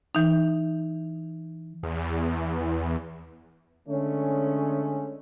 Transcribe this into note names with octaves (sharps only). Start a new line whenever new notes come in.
E3 D#4
E2
D3 G#3 A3 C#4